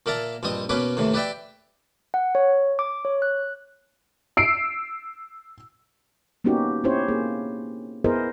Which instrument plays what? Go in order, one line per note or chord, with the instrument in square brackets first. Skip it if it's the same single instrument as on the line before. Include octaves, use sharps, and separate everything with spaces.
[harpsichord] A#2 A#3 A#4 E5 A5 A#5
A#1 G2 C4 D#5 D#6
B2 A#3 C#4 B4 G#5 D6
D#2 A2 C3 E3
G4 B4 D5 E5 G5
[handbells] F#5
C#5
D6
C#5
F#6
[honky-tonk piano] E6 C7 D7
[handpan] A#3 B3 C#4 D#4 F#4 G4
C4 C#4 E4 G4 C5 C#5
A#3 G#4
B3 E4 G#4 A#4 C5 D#5